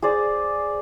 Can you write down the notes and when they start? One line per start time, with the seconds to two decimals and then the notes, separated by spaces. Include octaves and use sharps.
0.02 G#4 C5 D5